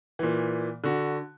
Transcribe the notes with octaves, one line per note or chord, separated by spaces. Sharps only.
A#2 E3
D3 F#4